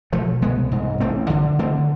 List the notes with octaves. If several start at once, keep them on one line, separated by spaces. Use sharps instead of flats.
B2 F3 A3
C2 G#3 B3
G#2
A1 A3 C4
D3
D3 A3 C4